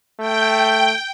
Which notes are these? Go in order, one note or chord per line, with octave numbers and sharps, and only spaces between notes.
A3 G5